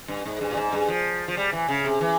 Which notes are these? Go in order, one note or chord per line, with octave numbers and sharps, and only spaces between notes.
G2
G#2
G2
A#2
G#2
G2
F3
F3
G3
E3
C#3
C3
E3